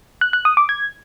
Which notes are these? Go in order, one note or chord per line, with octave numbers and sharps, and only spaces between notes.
F#6
F#6
D#6
D6
G#6